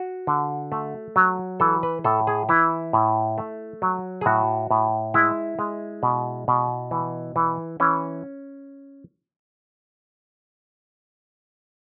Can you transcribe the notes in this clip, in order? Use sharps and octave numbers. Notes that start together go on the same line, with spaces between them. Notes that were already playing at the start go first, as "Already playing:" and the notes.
Already playing: F#4
D3
A3
F#3
E3 A4
B4
A2 A4
G#4
E3 E4
A2
A3
F#3
G#4
A2 F#4
A2
G#3 E4
G#3
B2
B2
E3
E3
E3 C#4